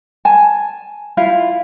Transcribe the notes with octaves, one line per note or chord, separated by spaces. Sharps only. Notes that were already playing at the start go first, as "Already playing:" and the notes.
G#5 A5
E4 F4 F5